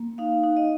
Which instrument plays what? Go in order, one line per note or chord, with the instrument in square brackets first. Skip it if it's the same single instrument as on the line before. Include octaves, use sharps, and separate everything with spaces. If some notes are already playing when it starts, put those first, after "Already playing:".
Already playing: [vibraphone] A#3
D#4 F5
D#4
D#5